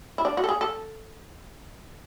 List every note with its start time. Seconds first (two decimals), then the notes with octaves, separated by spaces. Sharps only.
0.18 E4
0.25 D4
0.37 F#4
0.44 A4
0.49 G#4
0.61 A4